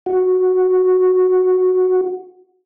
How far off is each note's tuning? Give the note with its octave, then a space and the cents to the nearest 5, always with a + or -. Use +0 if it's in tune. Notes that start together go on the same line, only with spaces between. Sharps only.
F#4 -5